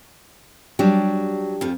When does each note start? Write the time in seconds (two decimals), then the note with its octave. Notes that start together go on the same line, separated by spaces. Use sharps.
0.79 F#3 G3 D4 G4
1.61 F2 F3